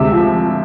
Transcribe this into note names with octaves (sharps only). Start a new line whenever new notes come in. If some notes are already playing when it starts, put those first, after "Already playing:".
Already playing: D2 C3 G#3 E5
F3